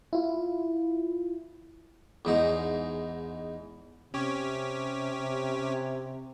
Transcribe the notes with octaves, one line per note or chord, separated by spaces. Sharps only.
E4 F4
E2 G#2 D#4
C3 C#4 G4 C#5